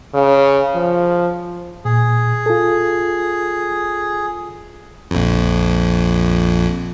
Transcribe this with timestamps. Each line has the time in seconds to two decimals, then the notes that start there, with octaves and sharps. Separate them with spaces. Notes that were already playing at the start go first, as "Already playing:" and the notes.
0.14 C#3
0.75 F3
1.85 A#2 G#4
2.46 F4 A4
5.11 A#1 F2